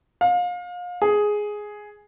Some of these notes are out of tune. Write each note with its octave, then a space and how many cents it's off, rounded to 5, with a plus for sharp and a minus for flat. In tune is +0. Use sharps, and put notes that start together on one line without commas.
F5 +30
G#4 +5